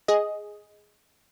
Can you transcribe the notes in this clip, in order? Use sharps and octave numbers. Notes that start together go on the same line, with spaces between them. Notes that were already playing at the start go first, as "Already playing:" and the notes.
G#4 D#5